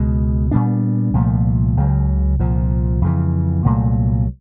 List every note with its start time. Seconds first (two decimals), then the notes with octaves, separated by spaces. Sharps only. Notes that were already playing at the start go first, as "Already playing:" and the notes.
Already playing: C#2 B2 G#3
0.51 A#2 G3 B3 D4
1.14 C2 A#2 F3 A3
1.77 C#2 C#3 F#3
2.39 C2 A#2 F3
3.02 F2 C#3 E3
3.64 C2 A#2 F#3 A3